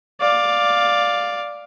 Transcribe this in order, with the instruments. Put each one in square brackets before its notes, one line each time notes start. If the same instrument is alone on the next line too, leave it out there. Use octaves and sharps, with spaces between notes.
[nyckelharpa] D5 F5